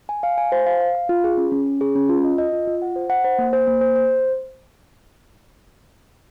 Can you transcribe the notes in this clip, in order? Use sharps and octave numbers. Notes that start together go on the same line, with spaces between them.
G#5
F5
G#5
C5
F5
F5
F5
F4
G#4
C#4
C#4
C#4
G#4
C#4
F4
D#5
D#5
F4
F4
F#5
C5
F#5
C5
A#3
C5
A#3
C5
C5